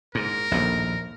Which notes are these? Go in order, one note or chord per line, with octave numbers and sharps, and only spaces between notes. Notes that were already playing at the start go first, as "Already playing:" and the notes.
G#2 A#4
A#1 D#2 A2